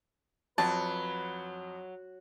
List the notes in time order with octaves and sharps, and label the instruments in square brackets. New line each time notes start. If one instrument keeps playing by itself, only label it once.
[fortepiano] F2 [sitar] F#3 [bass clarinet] B4 [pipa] A5